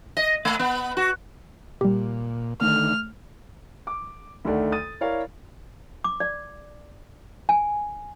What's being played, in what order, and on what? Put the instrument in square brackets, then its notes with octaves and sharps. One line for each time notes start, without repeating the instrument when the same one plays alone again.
[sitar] D#5
A3
B3
F#4
[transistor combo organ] A#2 [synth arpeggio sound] G3 G4
[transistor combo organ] D3 D#3 [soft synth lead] A3 [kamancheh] F6
[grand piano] D6
D2 D#3 A3 D5 F#5
D#6 A6 D#7
E4 A#4 C#5 D5 F5
[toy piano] D6
D5
G#5